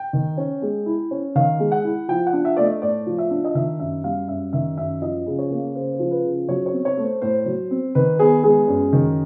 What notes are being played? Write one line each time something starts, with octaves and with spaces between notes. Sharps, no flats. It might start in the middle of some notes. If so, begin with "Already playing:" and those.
Already playing: G5
D#3
C#4
G#3
E4
C#4
D#3 F5
G#3
F#5
E4
F3 G5
F#5
D4
E5
A3 D5
D#5
A2 D5
F3
E5
D4
D#5
D#3 E5
F#2 E5
G3 F5
F#2 E5
D#3 E5
F#2 E5
F3 D#5
C#3
C#5
A#3
C#3 C5
C5
F3
B4
C#3
F#3 C#5
C#5
C4
C#5
A3
C5
A2 C5
F#3
C4
D#3 B4
B3 G#4
G#3 G#4
F#2
D#3